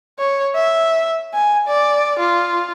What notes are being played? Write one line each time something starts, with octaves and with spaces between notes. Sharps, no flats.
C#5
E5
G#5
D5
F4